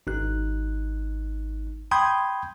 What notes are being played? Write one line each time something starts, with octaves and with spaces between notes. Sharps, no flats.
G#1 D#4 F#6
G5 B5 C6 D#6 G6 G#6